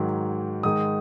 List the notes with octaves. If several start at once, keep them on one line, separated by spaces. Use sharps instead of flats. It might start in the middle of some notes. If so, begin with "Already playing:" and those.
Already playing: G#2 D#3 F#3
G#2 D#3 G#3 D#4 D#6